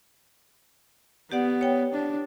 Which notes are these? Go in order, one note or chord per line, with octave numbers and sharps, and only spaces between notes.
B3 G4 D5 F#5
C#5 G5
D4